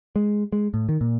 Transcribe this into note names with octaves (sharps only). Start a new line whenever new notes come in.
G#3
G#3
A2
D#3
A#2